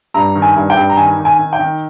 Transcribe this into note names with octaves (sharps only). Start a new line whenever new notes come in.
G2 A#5
D#3
G#5
G2
G5
G2
A#5
D#3 G#5
D#3
G#5
D#3
G5
D#3